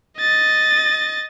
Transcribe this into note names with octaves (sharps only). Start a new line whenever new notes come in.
D#5 A6